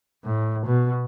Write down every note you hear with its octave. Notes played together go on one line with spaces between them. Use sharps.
A2
B2